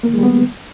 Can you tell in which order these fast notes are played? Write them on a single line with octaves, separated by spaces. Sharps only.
A#3 D#3 G#3 G3 B3